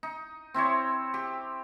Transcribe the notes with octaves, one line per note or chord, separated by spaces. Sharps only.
D#4
C4 E4 C5 C#5
G4